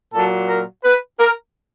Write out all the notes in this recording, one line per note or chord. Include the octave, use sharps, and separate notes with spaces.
A#2 F#3 A4
A#4
B4
A#4